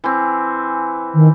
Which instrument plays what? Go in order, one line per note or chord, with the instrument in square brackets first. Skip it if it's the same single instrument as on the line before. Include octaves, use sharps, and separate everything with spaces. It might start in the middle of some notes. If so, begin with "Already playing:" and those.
[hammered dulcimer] E3 C4
[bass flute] D#3